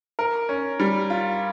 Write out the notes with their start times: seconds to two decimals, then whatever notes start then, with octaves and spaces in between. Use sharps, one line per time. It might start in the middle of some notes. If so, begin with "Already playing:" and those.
0.19 A#4
0.49 C#4
0.80 G3
1.10 F4